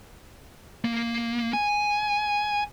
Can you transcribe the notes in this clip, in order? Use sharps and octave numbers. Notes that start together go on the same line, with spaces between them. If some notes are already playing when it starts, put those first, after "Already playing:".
A#3
G#5